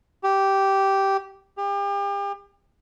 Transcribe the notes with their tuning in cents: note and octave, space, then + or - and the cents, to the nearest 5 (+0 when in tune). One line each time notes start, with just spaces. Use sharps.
G4 -10
G4 +35